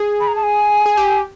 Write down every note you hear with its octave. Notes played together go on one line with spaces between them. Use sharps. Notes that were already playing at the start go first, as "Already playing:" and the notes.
Already playing: G#4
B5
A#5
A5
G#5
G#4
G4